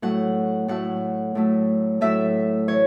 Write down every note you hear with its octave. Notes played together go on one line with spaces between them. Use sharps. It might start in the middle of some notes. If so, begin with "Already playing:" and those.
A2 F#3 A3 F#5
A2 F#3 A3 F#5
A2 F#3 A3
A2 F#3 A3 E5
E3 C#5